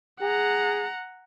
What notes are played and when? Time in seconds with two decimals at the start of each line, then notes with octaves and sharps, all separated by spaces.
0.22 G#4 F#5 A#5